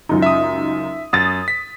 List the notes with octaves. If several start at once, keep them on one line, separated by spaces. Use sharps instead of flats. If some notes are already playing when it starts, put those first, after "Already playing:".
C#2 F#2 D#4
E5 D#6
F#2 D#6 A6
B6